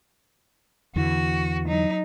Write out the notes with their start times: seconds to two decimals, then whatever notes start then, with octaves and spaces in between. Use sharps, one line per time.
0.96 E2 D3 E3 F#4
1.68 F#3 D#4